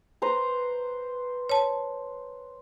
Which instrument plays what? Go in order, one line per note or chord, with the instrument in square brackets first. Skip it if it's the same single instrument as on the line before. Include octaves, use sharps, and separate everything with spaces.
[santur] B4 C5 A#5
[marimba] C#5 A5